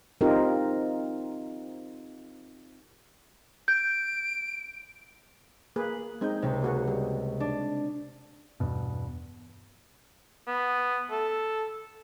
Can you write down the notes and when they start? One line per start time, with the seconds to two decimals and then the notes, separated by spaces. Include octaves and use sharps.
0.21 C4 D#4 F4 G4 A#4
3.68 G6 D7
5.76 A#3 G#4 B4
6.21 G#3 C4 D#4 G6 G#6
6.42 C#2 C3
6.62 A#3 F#4 G#4
6.88 G3
7.40 D4
8.60 E2 G2 B2
10.47 B3
11.11 A4